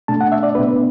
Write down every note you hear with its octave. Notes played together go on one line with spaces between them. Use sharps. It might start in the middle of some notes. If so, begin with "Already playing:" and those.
B2 A3 D4 A5
F#5
E5
D5
B2 B3 D4 B4